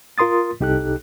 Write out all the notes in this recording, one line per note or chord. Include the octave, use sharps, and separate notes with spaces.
F4 A#4 C6 D#6 A6
C2 D#4 G4 A4 F#6